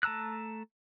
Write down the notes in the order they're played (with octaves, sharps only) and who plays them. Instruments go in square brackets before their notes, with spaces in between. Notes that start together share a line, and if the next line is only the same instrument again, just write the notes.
[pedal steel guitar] A3 A5 A#5 E6 F#6